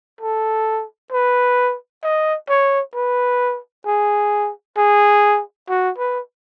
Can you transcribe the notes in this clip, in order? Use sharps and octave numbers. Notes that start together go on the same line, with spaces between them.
A4
B4
D#5
C#5
B4
G#4
G#4
F#4
B4